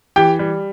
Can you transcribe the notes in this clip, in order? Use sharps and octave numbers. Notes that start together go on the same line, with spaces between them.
E3 G4 G5
G3